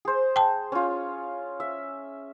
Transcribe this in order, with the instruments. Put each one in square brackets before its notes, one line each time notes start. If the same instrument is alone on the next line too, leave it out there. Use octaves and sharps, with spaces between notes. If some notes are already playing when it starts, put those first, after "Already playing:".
[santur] G#4 C5
[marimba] G5 A5
[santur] C#4 F4
E5